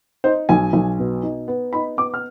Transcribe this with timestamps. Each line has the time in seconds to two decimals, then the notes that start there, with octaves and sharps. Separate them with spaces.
0.24 D#4 C5
0.49 B1 G#5
0.73 B1
0.99 B2
1.23 D#4
1.48 B3
1.73 D#4 B5
1.97 B3 D6
2.14 F6